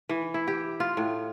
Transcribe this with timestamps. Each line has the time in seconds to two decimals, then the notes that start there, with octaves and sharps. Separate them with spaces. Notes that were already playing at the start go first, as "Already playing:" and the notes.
0.09 E3
0.34 E4
0.48 G4
0.80 F4
0.97 A2